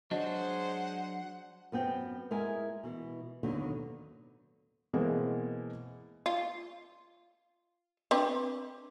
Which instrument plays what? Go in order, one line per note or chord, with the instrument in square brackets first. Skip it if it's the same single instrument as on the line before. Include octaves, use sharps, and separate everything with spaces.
[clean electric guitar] F#3 D4 [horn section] G#3 C5 [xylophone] D#5 [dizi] F#5
[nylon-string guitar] F#2 B3 C4 G5
G#3 E4 A#4 D#5 E5 G#5
B2 E3
D#2 B2 D3 D#3 F#3 A#3
[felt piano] B2 E3 G#3 A#3 C4
[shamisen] F4
C4 D4 B4